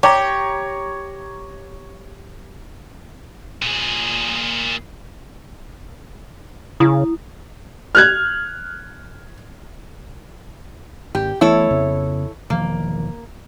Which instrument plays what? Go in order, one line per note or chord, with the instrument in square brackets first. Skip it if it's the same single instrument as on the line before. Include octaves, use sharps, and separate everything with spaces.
[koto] G4 [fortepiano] C#5 A#5
[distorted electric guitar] A#2 G#4
[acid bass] C#3 [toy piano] E4 D#6
[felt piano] F6 F#6 G#6
[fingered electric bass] G#1 [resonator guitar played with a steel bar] G4
[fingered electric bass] E3 A3 B3 [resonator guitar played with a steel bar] E4 A4 C#5
[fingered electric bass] F2 C#3 B3
[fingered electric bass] E1 D#3 F3 [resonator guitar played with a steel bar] A#3